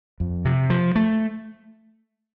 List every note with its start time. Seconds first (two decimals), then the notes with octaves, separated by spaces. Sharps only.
0.20 F2
0.45 C3
0.70 F3
0.95 A3